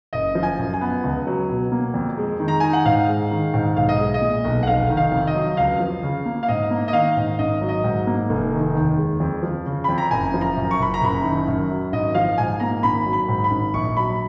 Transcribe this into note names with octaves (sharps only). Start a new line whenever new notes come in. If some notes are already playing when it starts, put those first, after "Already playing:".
F#1 D#5
F3
G#5
F#2
G#5
B3
C#2
F#3
B2
A#3
F2
G#3
D#3
A#5
D#4 G#5
F#5
G#2 F5
G#3
D#3
G#2
B1 F5
D#5
G#3
D#5
A#2
B1
F#5
F1 F5
D#3
F5
F2
D#5
F#3
C#2 F5
F3
C#3
A#3
F5
G#2 D#5
A#3
D#5
D#3 F5
G#2
G#1 D#5
F#3
D#5
G#2
A#3
F1
D#3
D#2
G#3
F2
F3
C#3
F2 B5
A#5
F#1 G#5
F3
A#5
F#2
C#6
F#1 B5
A#5
F#1 B5
D#3
F#2
F#3
G#1 D#5
F3 F5
G#2 G#5
A#3 A#5
G#1 B5
F#3
B5
G#2
B5
G#1
A#1 C#6
F#3 B5